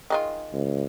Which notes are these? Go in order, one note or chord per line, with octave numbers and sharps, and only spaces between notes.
D#3 G#3 F4
C#2